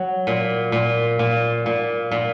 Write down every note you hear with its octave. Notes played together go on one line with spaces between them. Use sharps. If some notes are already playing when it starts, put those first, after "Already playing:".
Already playing: F#3
A#2
A#2
A#2
A#2
A#2